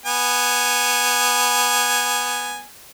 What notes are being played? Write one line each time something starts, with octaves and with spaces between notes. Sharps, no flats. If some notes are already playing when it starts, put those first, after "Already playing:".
B3 G#5